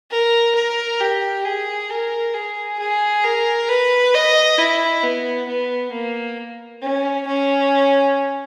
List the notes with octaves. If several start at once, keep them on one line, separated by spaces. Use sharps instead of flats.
A#4
A#4
G4
G#4
A#4
G#4
G#4
A#4
B4
D#5
E4
B3
B3
A#3
C#4
C#4